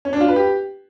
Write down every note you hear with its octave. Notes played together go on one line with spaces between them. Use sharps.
C#4
D4
F4
B4
G4